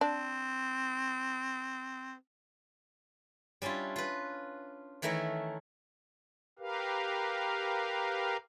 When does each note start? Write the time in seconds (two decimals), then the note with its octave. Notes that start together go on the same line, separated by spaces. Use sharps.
0.01 C4 D4
3.62 G3 C#4 D4 E4 F4
3.96 F4 B4
5.02 D#3 E3 A3 E4 A#4 C#5
6.59 G4 A#4 B4 F5